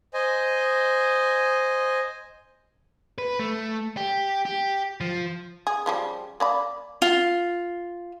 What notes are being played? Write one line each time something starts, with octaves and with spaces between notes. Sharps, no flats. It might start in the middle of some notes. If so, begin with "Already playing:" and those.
C5 D#5 G#5
B4
A3
G4
G4
F3
G#4
C#3 F3 G3
A#3 D5 B5
F4